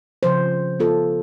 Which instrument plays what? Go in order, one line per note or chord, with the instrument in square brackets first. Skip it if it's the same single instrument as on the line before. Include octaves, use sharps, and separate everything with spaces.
[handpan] C#3 F3 C5
B3 F4 A4